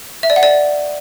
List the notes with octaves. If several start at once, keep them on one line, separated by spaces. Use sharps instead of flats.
E5
D5
F#5
D5